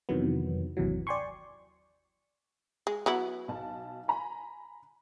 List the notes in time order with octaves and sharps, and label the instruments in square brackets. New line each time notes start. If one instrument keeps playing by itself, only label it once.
[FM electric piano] F2 C3 D#3 E3 F#3 B3
G1 D#2 C3 E3 F#3
D5 G5 G#5 C6 C#6
[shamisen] G#3
F#3 B3 E4
[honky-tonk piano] B1 A5
G#5 A#5 B5